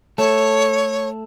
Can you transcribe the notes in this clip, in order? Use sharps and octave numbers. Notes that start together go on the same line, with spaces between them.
A3 A4 C#5